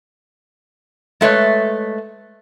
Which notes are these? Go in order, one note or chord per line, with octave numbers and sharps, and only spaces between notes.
G#3 A3 B4 C#5